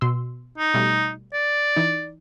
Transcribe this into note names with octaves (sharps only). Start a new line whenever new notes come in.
B2 C6 E6
D#4
B2 G3 A3
D5
E3 D#4